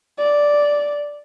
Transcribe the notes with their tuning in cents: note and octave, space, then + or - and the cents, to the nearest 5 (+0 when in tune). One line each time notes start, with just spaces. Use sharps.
D5 -5